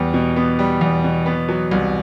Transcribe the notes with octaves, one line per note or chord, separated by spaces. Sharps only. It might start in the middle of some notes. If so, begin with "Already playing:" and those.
Already playing: E2 G3 B3
B2
B3
G3
E2
B2
B3
F#3
C2